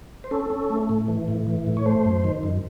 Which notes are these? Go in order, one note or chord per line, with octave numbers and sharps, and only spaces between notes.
C5
C#4 A4
C#4
A3
A2
E3
A2
E3
A2
C#5
A3 C5
F#2
D#3
F#2